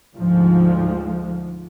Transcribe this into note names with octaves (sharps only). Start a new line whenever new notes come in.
D2 G#2 F3